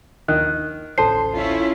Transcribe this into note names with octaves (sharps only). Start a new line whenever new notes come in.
D#2 D#3 F#6
D1 A1 A4 C5 A5 C7
C#4 E4 F4